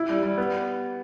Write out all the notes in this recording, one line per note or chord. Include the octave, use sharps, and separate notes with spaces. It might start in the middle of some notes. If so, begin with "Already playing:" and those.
Already playing: E4
G3
G3
B3